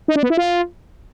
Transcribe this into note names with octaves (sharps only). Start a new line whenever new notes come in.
D#4
D4
B3
E4
F4